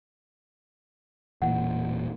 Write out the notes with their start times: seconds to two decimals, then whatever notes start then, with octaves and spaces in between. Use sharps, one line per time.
1.42 E1 A#2 E3 F#5